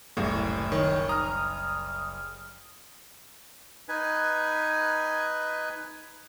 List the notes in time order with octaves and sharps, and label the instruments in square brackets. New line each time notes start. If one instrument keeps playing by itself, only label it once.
[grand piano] F#1 C2 [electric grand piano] A2
[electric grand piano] D#3 [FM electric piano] C#5
[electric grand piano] A#5 [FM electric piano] D#6 F6
[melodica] D#4 B4 G#5